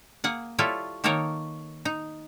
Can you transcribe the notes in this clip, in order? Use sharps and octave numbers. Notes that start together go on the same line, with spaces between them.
A#3 G#4 F#5
G3 E4 F4 A4 C#5
D#3 A#3 D#4 A4 A#4 C#5
D#4